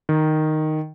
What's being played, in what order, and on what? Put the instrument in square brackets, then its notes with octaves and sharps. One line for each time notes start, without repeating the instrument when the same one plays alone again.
[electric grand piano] D#3